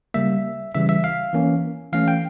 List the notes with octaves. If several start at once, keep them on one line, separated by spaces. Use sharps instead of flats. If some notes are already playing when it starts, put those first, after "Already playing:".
C#3 G3 A#3 E5
C#3 E3 G3 E5
E5
F5
E3 A#3 C#4
E3 A3 C#4 F5
G5